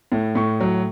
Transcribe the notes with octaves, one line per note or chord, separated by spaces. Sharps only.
A2
A2 C#6
F#3